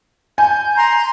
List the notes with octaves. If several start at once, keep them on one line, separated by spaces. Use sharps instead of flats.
G#5 G6
A#5 C6